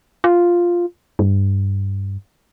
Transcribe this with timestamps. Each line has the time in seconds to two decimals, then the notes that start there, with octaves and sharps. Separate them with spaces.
0.24 F4
1.19 G2